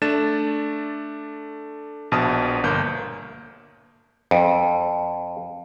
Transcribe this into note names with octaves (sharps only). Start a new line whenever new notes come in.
A3 D4 A6 E7
A#1 B2 A5 D#6
G1 A#3 G6
F2